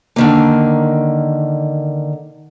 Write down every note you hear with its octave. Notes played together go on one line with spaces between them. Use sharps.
D3 D#3 A#3